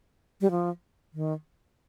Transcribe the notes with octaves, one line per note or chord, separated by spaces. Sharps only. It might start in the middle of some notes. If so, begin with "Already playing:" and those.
G3
F3
D#3